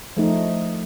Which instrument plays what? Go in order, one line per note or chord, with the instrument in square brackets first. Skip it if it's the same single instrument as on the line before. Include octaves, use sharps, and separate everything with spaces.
[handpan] F3 A3 D#4